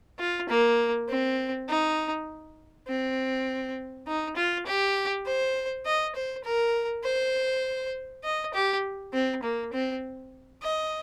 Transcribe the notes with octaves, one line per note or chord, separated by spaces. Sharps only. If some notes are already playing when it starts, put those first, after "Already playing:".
F4
A#3
C4
D#4
C4
D#4
F4
G4
C5
D#5
C5
A#4
C5
D#5
G4
C4
A#3
C4
D#5